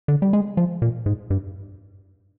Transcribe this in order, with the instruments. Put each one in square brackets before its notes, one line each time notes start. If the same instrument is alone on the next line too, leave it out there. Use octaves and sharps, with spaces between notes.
[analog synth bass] D3
G3
G#3
F3
A#2
G#2
G2